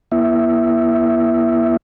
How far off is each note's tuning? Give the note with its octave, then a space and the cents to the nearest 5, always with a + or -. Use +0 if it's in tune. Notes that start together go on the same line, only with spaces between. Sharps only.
B3 -45 E4 +15 E5 +0